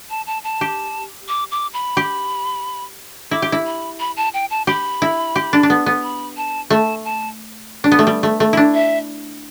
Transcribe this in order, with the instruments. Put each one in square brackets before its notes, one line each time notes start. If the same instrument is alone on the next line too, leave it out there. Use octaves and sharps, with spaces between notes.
[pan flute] A5
A5
A5
[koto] G4
[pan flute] D6
D6
B5
[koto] G4
[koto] E4 [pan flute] D6
[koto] G4
E4
[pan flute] B5
B5
A5
G5
A5
[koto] G4 [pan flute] B5
[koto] E4
G4
D4
D4
B3
B3
[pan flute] B5
A5
[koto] A3 [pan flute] A5
[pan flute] A5
[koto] D4
B3
A3
G3
A3
A3
D4 E4
[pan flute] E5